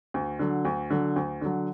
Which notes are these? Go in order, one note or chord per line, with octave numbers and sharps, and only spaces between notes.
D2
D3 F#3
D2
D3 F#3
D2
D3 F#3